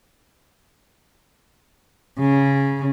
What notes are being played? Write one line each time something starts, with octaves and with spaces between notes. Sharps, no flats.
C#3